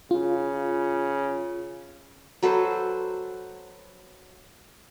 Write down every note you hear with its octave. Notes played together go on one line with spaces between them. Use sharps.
C#3 F4
F#3 A4 B4 C5